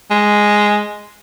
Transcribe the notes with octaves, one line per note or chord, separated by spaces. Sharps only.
G#3